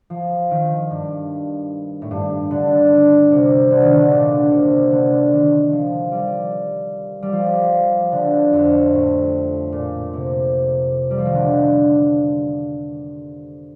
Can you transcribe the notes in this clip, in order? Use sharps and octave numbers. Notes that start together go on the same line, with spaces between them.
F3
D#3
G2
A2
G2
D3
C3
D3
D#3
D3
A#2
C3
D3
D#3
F3
G3
G3
F3
D3
F2
A2
A#2
C3
G3
F3
D#3
D3